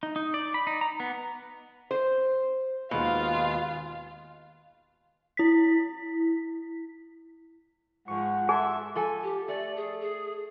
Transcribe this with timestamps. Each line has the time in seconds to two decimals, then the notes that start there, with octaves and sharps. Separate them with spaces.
0.03 D#4
0.16 D#4
0.34 D5
0.54 B5
0.67 D#4
0.81 A#5
1.00 B3
1.91 C5
2.91 D#2 B2 G#3 F4 F5 C6
5.37 E4 B6
8.08 G#2 F3 G#3 F#5 C#6
8.49 G#4 A4 E5 G#5 A5 C6
8.95 F3 A4 G#5
9.23 G4
9.48 A3 D5
9.76 G#4
10.01 G#4